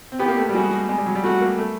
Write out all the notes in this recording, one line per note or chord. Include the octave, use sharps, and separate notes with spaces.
C4
B3 G4
A#3
A3
G3
G#3 F#4
G#3
G3
F#3
G3
A3 F#4
A#3
A3